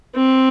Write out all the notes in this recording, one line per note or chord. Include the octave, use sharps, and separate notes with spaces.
C4